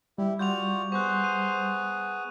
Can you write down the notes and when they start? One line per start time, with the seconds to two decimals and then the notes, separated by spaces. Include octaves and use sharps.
0.18 G3 E4 G4
0.39 F4 F#4 D5 G6 F7
0.92 B3 G#4 C5 C#6 F#6
1.24 D#7